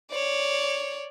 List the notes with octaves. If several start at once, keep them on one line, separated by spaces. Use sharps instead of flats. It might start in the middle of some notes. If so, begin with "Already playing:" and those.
C#5 D5